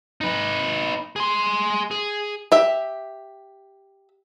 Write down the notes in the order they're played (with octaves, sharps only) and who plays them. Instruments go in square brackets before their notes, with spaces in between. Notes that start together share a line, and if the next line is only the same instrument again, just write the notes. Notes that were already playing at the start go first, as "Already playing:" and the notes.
[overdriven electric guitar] D#4 B4
G#4 C6
G#4
[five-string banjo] G4 E5